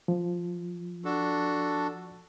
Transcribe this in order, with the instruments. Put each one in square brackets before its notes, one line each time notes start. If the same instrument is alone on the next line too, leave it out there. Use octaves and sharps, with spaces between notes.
[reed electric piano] F3
[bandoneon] D4 F#4 A4